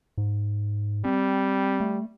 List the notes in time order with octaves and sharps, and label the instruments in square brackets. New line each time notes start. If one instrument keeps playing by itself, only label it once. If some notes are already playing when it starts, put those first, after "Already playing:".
[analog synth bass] G#2
[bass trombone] G3 [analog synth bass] C4
[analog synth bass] A3